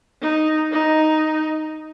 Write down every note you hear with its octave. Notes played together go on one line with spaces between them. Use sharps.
D#4
D#4